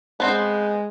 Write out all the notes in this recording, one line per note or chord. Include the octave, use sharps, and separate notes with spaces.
G#3 B3 C4 C5